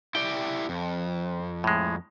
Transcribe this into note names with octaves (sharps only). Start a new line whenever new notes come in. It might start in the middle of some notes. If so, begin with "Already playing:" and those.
E4 G4 D5 G5
F2
A2 G#3